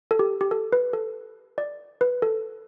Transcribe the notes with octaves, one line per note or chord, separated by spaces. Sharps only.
A4
G4
G4
A4
B4
A4
D5
B4
A4